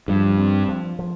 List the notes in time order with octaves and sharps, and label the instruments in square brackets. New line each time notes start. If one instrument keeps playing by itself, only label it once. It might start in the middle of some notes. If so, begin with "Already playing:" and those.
[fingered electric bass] G2 [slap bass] F3
[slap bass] C4
F3
F3